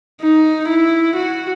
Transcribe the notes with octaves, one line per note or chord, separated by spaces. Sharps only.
D#4
E4
F#4